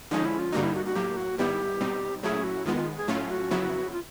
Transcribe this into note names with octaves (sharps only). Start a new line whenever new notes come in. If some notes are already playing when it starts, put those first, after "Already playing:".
D3 F3 G#3 C#4 D#4
E4
F4
G2 D3 G3 A#3 D#4 F#4
E4
F#4
F#4
A2 F#3 A#3 G4
F#4
G#2 D#3 G3 B3 E4 G4
B2 G3 C4 D#4
A#2 F#3 A3 C#4 E4 G#4
F#4
D#2 D#3 G#3 B3 F4
F4
G#4
A2 F#3 A3 C#4 F4
F#4
F2 C#3 F#3 B3 E4
F4